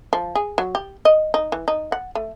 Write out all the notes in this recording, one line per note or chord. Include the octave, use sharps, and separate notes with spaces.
F3
G#4
F#3
G4
D#5
D#4
E3
D#4
F#5
A3